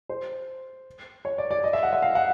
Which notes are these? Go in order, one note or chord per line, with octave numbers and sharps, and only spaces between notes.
C5
C#5
D5
D5
D#5
E5
F#5
E5
F5
F#5